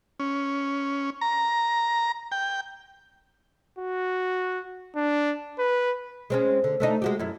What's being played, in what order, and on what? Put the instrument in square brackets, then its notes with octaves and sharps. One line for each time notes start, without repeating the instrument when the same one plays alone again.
[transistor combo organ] C#4
A#5
G5
[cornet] F#4
D4
B4
[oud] G#3 C4 C#4
D3
A3 D4 D#4
G#3 F#4 G4
F#2 E4